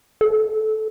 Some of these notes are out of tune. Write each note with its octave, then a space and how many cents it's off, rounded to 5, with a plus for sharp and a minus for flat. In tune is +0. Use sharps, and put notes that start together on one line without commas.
A4 -15